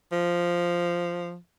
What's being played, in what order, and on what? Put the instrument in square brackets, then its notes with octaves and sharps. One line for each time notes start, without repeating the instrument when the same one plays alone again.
[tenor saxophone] F3